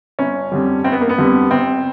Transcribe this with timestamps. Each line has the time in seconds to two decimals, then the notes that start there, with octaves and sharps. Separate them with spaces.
0.19 G1 C#4
0.52 F2 D3 G3
0.84 G1 C4
0.92 B3
1.01 A#3
1.09 B3
1.18 F2 D3 G3
1.51 G1 C4